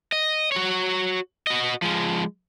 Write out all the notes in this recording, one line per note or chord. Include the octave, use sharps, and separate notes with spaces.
D#5
F#4 C#5
F#4 D#5
F3 G#3